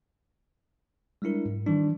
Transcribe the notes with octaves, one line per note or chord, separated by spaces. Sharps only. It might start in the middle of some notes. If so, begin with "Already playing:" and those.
G3 G#3 D4 E4 A#4
G#2
D#3 E3 G3 D4